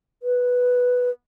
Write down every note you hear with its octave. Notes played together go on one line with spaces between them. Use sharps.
B4